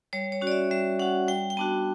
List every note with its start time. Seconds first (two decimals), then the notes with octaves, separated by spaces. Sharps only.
0.13 G3 C#5
0.32 C#5
0.41 C#4 F#4
0.47 D5
0.52 E5
0.71 G3 E5
0.99 C#4 F#4 F#5
1.28 G3 G5
1.50 G5
1.57 B3 D4 F#4 A5